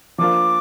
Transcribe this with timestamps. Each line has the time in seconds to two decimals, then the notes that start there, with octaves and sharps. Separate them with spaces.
0.18 F3 A#3 D4 F4 D6